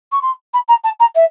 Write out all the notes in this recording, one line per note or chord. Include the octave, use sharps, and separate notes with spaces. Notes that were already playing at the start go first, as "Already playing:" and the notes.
C#6
C6
B5
A#5
A5
A#5
E5